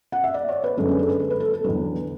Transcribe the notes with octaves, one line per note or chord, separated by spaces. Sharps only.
F#5
E5
D5
C#5
B4
F#2 D3 G#3 A4
B4
A4
B4
A4
B4
A4
A4
E2 D3 F#3 B4